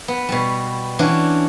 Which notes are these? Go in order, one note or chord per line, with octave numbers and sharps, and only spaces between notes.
B3
B2 G3
E3 C#4 D4 F#4